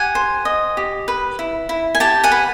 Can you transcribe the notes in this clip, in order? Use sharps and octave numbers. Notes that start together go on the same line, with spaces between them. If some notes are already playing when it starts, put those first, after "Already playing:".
Already playing: G4 F#5 G#5
C5
D#5
G4
B4
E4
E4
G#5
G4 G5 A5
F#5 G#5
B4